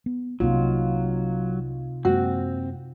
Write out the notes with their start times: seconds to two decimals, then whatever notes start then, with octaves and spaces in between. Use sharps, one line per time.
0.06 B3
0.40 C2 C3 F#3 A#3 D#4 F4
2.05 F#2 G#3 A#3 C4 F#4